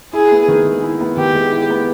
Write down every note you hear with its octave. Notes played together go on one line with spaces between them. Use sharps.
E4 G#4
B3
D#3
G#3
E4
B3
D#3 G4
G#3
E4
B3